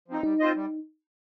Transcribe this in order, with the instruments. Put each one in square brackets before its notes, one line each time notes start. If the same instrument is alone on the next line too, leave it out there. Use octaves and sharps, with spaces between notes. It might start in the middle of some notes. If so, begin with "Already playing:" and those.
[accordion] F3 C4 D#4
[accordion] G3 [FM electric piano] D#4
[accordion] C4 F4 C5 D#5
G3